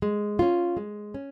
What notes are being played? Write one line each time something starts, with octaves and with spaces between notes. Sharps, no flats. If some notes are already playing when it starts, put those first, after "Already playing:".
G#3
C#4 F4
G#3
C#4